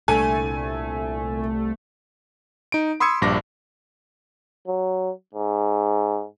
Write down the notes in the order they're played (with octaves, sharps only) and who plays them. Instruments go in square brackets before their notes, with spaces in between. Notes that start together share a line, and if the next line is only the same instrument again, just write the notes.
[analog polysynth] C2 A3 [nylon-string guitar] A#2 D4 A4 [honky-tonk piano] G#5
[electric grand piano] D#4 D7
B5 C6 D#6 E6 G#6 C#7
A#1 G2 D6 A#6
[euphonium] F#3
G#2